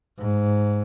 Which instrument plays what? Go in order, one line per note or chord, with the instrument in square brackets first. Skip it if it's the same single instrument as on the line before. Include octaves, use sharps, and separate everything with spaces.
[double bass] G#2